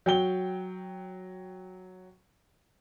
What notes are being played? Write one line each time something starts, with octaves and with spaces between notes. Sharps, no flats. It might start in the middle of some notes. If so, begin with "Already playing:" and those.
F#3 G5 G7